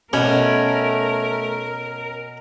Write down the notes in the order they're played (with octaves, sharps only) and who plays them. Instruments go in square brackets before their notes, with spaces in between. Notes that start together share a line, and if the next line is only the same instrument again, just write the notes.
[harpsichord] B2 [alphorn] A3 [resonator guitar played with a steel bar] C#4 [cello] A#4